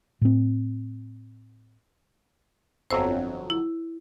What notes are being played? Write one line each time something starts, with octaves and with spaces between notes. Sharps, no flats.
A2 C4
G1 F2 F#3 C5 E6
E4